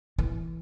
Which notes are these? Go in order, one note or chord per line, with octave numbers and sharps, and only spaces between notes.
E3